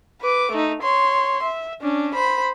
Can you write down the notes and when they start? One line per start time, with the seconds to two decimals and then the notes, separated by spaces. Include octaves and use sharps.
0.21 B4 D6
0.51 A3 D#4
0.81 C#5 C6
1.43 E5
1.81 C#4 D4
2.15 C5 B5